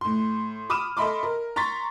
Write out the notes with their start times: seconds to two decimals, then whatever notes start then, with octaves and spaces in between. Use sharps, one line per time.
0.01 A2 C6
0.70 B5 D6 D#6 F6 D#7 E7
0.97 A4 D#5 E5 B5 C6 D6
1.23 A#4
1.56 A#5 C6 C#6 A6 B6